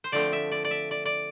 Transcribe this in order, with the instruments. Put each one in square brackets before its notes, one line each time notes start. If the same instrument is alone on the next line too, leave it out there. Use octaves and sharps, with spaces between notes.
[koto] C5
D3 F3 A3 C4 D5
E5
D5
D5
E5
D5
D5